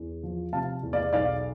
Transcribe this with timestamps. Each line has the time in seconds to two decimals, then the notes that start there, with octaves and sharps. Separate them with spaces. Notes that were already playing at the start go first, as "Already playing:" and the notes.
Already playing: E2
0.23 F3
0.53 C3 F5 A5
0.83 E2
0.93 D5 F5
1.13 B1 D5 F5